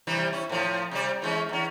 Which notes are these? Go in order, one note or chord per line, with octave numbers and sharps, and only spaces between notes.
C3 E3 G3
C#4 E4
A2 F3
C3 G3 D5
E3 G#3 C#4
E2 C#4